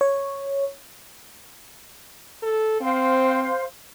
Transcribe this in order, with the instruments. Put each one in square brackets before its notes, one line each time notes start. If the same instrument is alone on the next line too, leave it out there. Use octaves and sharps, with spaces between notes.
[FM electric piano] C#5
[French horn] A4
[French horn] C4 [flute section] C5 F5 C6